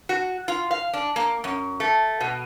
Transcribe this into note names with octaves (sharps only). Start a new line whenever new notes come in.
F#4
F4
F5
D4
A#3
F#2
A3
B2